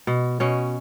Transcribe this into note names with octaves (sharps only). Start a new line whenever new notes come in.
B2
B2 C#4